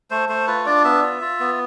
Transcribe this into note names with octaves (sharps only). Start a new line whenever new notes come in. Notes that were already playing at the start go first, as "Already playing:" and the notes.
A3 C5
A3 C5
F4 B4
D4 D5
B3 E5
F4
F4
B3